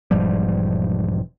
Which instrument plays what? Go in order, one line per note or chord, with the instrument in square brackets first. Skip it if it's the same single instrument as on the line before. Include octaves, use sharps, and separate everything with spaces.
[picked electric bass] E1 G#2 F3 G3